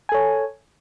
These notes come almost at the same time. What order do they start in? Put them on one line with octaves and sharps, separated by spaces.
G#5 A4 C#5